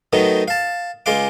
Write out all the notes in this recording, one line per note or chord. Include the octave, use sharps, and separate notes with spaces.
D#3 F#3 A3 B3 D#4
F5 A5
C#2 G#3 F4 F5 D6